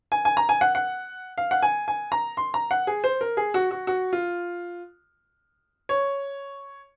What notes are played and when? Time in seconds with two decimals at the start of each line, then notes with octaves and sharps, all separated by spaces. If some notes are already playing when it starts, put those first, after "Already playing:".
0.12 G#5
0.25 G#5
0.37 A#5
0.49 G#5
0.61 F#5
0.75 F#5
1.38 F5
1.51 F#5
1.62 G#5
1.88 G#5
2.12 A#5
2.37 C6
2.54 A#5
2.71 F#5
2.87 G#4
3.04 C5
3.21 A#4
3.37 G#4
3.54 F#4
3.71 F#4
3.87 F#4
4.13 F4
5.89 C#5